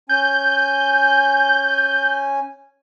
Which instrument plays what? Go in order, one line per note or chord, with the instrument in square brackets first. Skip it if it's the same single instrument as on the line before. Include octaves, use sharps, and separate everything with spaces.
[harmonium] C#4 G#5 [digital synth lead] G6